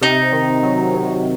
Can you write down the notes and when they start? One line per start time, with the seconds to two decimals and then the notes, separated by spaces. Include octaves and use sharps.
0.01 C3 D#4
0.32 D#3
0.63 F#3
0.94 C3